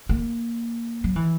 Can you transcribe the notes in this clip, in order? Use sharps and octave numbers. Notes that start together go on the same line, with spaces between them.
A#3
F#3
E3